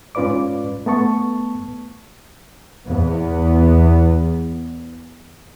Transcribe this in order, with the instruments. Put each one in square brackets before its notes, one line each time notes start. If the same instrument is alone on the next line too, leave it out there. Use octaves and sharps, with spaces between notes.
[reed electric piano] G#2 C#4 F4 B4 D5 D6
A3 B3 A5 C#6
[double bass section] E2 B3